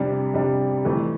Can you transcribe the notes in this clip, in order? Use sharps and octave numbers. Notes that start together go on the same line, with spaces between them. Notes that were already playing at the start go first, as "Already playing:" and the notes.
Already playing: F2 C3 G3 D4
F2 C3 G3 D4
F2 E3 A3